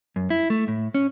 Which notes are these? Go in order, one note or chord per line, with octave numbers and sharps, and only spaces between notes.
F#2
E4
A3
A2
C#4